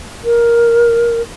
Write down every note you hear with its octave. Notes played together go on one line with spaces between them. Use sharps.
A#4